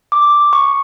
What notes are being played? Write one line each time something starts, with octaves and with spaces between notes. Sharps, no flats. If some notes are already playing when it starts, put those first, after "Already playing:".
D6
C#6